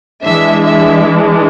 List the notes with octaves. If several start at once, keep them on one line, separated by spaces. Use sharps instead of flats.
E3 G#3 D4 E5
E5